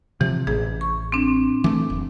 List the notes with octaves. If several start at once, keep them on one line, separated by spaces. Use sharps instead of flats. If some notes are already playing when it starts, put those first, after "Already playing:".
C3 E3 F3
A1 G#4
C#6
C4 D4
E3 A3 D6
F1